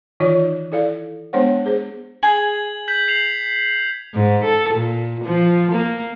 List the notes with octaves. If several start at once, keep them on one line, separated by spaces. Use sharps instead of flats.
D#3 E3 D#4 F4 C#5
E4 A4 D5 F5
G#3 B3 D4 C5 C#5 F#5
G#4 C5
G#4 G#6 F#7
G6 B6 F#7
C7 F7 F#7
G#2
A4
A#2
F3
A#3